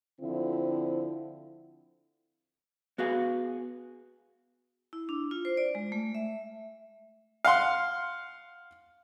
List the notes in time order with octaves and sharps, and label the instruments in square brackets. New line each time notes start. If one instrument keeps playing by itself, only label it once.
[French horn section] D3 F3 C4 E4
[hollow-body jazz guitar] B3 F#4 G#4 F5
[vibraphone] E4
D4
F4
C5
D5
G#3
A3
E5
[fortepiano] F5 F#5 C6